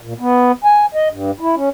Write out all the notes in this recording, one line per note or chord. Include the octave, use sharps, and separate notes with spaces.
A#2
B3
G#5
D#5
G2
E4
C#4